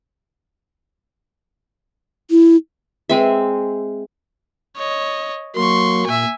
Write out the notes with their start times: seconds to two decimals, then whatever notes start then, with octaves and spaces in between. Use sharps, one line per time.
2.31 E4
3.10 G#3 C4 E5
4.76 C#5 D#5
5.56 F#3 A#3 C6 C#6
6.06 A#2 E5 G#5